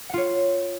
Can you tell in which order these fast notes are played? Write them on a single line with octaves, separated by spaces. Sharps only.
F#5 F4 C#5